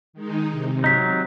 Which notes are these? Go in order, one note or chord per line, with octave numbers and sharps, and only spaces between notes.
D#3 G#3 D#4
C3
F#3 D#4 G6 B6